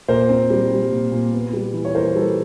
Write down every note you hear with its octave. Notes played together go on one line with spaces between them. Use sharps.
A#2 A#4 C5
C4
G3
G3
A#2
A#2
B3
G3
E3
C#5
E3 A#4 C5
G3 A4 B4